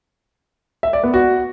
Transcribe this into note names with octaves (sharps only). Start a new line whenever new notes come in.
E5
D5
B3
F#4